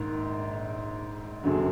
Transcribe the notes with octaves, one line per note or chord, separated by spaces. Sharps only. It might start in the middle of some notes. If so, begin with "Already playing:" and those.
Already playing: A#1 G#2 D#3
F#1 F#2 D3 F#3